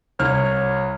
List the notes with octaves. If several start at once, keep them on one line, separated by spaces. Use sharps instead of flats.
C2 C#5 F6